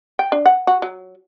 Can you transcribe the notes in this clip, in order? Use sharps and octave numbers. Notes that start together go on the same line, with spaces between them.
G5
D4
F#5
F#4
F#3